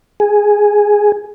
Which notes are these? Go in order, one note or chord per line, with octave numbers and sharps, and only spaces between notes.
G#4